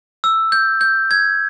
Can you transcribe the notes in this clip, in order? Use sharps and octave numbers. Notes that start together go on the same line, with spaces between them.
E6
G6
G6
G#6